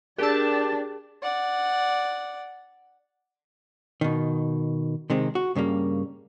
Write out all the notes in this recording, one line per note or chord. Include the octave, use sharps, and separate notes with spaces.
D4 G4 G#4 A#4 D5 A5 E6
D5 F#5
B2 D#3
C3 D#3 G#3 C4
F#4
G2 C#3 G3 A#3